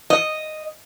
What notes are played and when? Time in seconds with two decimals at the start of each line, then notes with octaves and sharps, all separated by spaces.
0.10 D#5